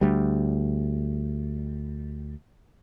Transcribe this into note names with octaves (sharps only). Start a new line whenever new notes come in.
D2 G3